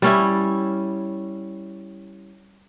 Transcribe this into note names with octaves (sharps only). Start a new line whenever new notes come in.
G3 C#4 E4